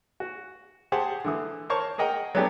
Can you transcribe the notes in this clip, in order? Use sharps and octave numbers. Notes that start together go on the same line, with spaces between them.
F#4
G4 G#4 C5 F#5 A5
D3 E3 D#6
A#4 C5 C#5 A5 C#6
G#4 A#4 D#5 F#5 G5
F#3 A3 B3 D4 G4 D5